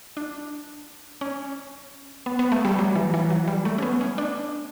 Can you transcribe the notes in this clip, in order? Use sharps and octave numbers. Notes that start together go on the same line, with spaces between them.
D4
C#4
B3
B3
A3
G3
F#3
E3
E3
F#3
G3
A3
C#4
B3
C#4
D4